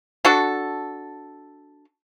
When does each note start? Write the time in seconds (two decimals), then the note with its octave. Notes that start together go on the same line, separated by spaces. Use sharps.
0.25 D4 F#4 A4